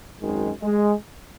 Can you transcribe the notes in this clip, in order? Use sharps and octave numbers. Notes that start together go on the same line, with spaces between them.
G#1 F#2 D#3 G#3
G#3